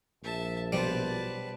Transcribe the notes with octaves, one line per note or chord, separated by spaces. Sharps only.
A#1 E5 A5
B2 F#3 G3 B4 C5 A5